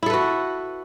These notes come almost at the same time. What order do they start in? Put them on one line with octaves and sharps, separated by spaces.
E4 A4 B4 F#4